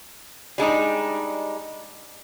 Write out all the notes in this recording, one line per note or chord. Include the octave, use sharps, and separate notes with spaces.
G3 G#3 D4 D#4